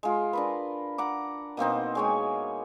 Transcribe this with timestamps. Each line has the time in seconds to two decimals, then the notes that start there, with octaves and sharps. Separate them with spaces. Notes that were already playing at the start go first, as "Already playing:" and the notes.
0.03 G#3 F4
0.33 D4 A#4 B4
0.98 F#5 A#5 D6
1.57 B2 A#3 C4 D#4
1.95 G#3 C#5 G#5